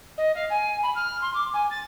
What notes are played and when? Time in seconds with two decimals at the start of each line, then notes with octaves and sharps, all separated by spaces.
0.17 D#5
0.35 F5
0.50 G#5
0.82 B5
0.95 F6
1.21 C6
1.34 D6
1.53 G#5
1.70 A6